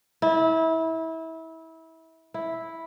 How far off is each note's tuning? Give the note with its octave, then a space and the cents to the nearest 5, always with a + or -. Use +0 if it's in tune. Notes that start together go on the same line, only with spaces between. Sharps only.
E4 -25
E4 -5